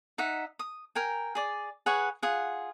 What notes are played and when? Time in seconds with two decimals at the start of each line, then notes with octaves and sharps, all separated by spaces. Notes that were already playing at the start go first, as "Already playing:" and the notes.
0.18 D#4 D#5 E5 F#5
0.59 D#6
0.95 A#4 G5 G#5
1.35 G#4 D5
1.86 G#4 B4 C#5 F#5
2.22 F4 G#4 F#5